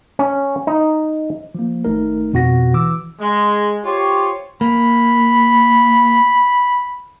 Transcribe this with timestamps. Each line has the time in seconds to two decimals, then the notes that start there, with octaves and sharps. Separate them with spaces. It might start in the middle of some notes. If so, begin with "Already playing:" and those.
0.19 C#4
0.67 D#4
1.55 F3 A#3
1.85 G#1 A3 D#4 A#4
2.33 F2 B2 F#4 F#5 A#6
2.74 E3 D6 E6
3.20 G#3
3.85 F4 G4 C5 C#5
4.61 A#3 B5